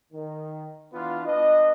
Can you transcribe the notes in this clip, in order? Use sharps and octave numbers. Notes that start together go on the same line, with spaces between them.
D#3
E3 B3 D4 F4
B3 D4 B4 D#5